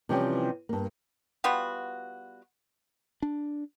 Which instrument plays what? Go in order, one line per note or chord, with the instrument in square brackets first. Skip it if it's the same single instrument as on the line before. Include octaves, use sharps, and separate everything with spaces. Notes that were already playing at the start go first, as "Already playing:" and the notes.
[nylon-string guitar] C3 E3 F3 G3 C#4 G4
G2 A#3
[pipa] G3 B3 F4 F#4
[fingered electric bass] D4